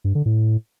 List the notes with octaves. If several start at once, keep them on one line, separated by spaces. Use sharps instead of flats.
G2
D3
A2